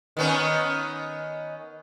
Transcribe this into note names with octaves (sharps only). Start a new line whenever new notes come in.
D#3 B3 C#4